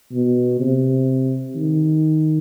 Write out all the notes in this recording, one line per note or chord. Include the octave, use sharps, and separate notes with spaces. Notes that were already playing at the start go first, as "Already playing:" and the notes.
B2
C3
D#3